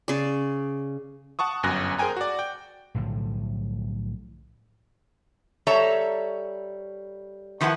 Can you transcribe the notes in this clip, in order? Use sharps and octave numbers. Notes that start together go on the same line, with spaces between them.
C#3 D5
F#5 A5 C#6 D#6
G1 F#2 G#5 F#6 A#6
G#4 A#4 C5 G5 G#5 A#5
F#4 D5
G5
B1 A2 D3 F3
G3 A4 C#5 E5 A#5
D#3 F3 E4 B4 F#5